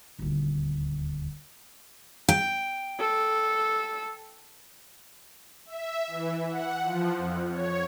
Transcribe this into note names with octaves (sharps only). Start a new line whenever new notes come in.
D#1 D2
G5
A4
E5
E3
F#5
F3
F2
C#5